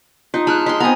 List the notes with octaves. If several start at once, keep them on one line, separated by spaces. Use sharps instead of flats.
D#4 F4
G#3 A5 F6 F#6
G#3 C6 B6
B3 C4 G#5 A#5